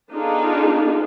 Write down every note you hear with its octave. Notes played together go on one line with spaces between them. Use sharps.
B3 D4 D#4 F4 G#4 A4